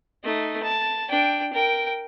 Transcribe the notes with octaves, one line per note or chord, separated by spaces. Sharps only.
A3 D#4
A5
D4 G5
A#4 G5